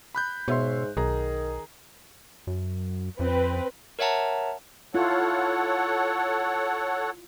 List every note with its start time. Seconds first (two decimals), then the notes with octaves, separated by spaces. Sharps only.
0.15 B5 F#6 G6
0.48 G#2 B2 C#5 E5 C6
0.97 B1 D#3 G#4 A#5
2.47 F#2
3.19 F2 C4 B4
3.99 A#4 C#5 E5 F#5 A5 A#5
4.94 E4 F4 A4 C#5 F#5